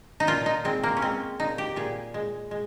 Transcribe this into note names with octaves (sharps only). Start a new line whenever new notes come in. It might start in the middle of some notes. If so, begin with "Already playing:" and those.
D#4
A#2 F4
D#4
G#3 C4
A#3
C#4
G#3 C4
A#2 D#4
G4
A#2 G#4
G#3
G#3